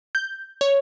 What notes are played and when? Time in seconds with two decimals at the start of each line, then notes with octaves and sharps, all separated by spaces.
0.15 G6
0.61 C#5